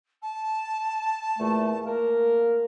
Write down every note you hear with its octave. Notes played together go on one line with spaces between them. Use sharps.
A5
E2 A#2 A3
A#3 A#4